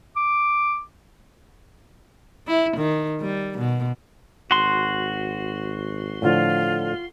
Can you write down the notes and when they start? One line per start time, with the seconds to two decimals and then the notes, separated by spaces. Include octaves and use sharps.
0.17 D6
2.47 E4
2.77 D#3
3.21 G3
3.58 B2
4.51 G#1 F#4 C6
6.22 A2 D3 F3 F4